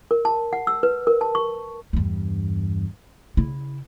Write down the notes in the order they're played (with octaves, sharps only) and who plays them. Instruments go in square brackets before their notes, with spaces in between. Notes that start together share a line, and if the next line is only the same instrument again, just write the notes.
[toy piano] A#4
A5
F#5
E6
B4
A#4
A5
C#6
[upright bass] E2 G2
C#3 E4